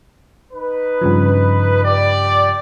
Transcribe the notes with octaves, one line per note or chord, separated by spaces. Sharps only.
D#4 B4
G2 C#3 F3
G4 D5